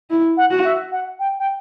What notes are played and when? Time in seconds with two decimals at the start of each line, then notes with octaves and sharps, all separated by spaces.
0.10 E4
0.37 F#5
0.51 F#4
0.64 E5
0.92 F#5
1.19 G5
1.39 G5